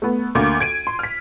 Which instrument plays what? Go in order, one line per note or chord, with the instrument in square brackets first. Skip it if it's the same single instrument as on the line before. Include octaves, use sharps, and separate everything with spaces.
[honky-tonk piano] A3 B3
D2 A#3 D6
G#6 D7 D#7
C6
F6 B6